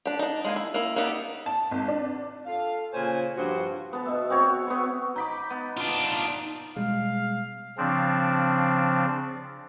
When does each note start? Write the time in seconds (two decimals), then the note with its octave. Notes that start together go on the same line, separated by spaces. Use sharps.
0.06 D4 G4
0.19 D4 D#4
0.44 G#3 A#3 G#5
0.56 E4
0.74 A#3 E4
0.96 A#3 B3 D#4 G4 D5
1.46 A5
1.71 G#1
1.88 D4
2.46 F4 A4 F5
2.93 A#2 C#3 C5 C#5 G#5
3.37 G2 F3 F#4 C5
3.93 B3 A5
4.06 B2 E5
4.30 C4 F#4 C#5
4.67 B3 C#5 C#6
5.16 D#4 B5 D6
5.50 B3
5.77 D4 F4
6.76 B2 G3 G#3 F5
7.78 C#3 F3 C4 D4